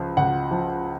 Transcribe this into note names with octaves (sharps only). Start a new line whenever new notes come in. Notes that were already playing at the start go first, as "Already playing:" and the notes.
Already playing: C#2 F3
C#2 F#5
F3